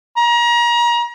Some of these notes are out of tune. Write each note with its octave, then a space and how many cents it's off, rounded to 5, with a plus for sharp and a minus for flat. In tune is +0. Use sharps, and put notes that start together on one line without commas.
A#5 +35